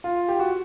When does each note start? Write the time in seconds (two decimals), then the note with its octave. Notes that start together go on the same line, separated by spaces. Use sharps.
0.04 F4
0.28 G4
0.39 F#4